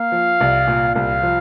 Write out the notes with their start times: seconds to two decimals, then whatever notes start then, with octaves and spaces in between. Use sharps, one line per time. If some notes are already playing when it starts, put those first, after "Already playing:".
Already playing: A#3 F5
0.12 F3
0.41 C2
0.67 A#2
0.95 C2 F5
1.23 F3